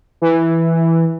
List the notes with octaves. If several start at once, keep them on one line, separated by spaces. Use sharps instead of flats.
E3